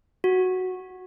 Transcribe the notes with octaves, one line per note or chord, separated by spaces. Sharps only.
F#4